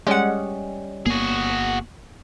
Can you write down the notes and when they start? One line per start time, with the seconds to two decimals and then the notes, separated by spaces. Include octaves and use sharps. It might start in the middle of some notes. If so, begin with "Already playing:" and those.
0.07 G3 G#3 C#4 D#5 F#5
1.06 G1 A#3 B3 F#4 G#4